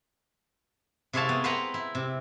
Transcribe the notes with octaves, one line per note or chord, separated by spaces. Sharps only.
C3 E4 G#4 C#5 F5 A5
B3
B4 C5 F#5 G5 A#5 C6
E4
C3